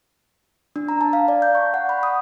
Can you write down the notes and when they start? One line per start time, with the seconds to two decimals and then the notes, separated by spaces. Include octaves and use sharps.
0.76 D4
0.89 A#5
1.01 A5
1.13 F5
1.28 D5
1.42 G6
1.55 C#6
1.74 F#5
1.89 B5
2.03 D#6